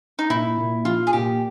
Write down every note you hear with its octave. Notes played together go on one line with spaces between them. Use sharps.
D#4
A#2 E4
A#2
F3 F4
G#4
A#2 G4